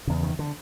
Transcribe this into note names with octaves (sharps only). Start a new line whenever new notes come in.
E2 C#3
D#3
D3